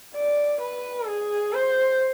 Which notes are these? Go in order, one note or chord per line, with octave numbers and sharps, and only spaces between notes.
D5
B4
G#4
C5